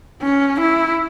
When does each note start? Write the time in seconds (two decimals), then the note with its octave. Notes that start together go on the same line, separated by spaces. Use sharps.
0.22 C#4
0.60 E4